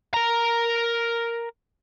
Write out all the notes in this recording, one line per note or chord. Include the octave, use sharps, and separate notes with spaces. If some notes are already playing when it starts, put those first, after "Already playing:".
A#4 A#5